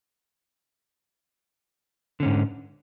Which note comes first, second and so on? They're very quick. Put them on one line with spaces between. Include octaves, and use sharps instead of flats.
D3 C#4 G#2